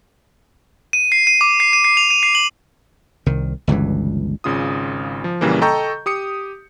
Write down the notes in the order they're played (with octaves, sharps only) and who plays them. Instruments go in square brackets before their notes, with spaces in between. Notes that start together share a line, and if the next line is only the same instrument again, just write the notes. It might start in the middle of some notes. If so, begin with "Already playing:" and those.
[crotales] D#7
C7
D#7
D6
C7
D#7
C7
F7
D#7
C7
F#7
[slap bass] C2 D#3
G1 C#2 G2 E3
[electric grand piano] G#1 C#3 F4 D#6
F3
A#1 C#3 E3 G3 A#3
A4 D#5 G5 A#5 C#6 G6
G4 D#6 C#7